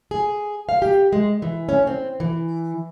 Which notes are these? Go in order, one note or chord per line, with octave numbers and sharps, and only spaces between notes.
G#4
F5
G4
G#3
E3
C#4
C4
E3